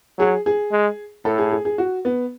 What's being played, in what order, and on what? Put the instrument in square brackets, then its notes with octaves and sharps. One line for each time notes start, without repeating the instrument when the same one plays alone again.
[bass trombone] F#3 [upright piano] G#4
[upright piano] G#4
[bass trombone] G#3
[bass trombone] A2 [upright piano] A4
[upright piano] G#4
G#4
G#4
F#4
B3